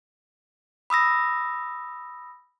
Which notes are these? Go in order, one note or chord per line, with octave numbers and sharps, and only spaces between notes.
B5 D#6 E6 A#6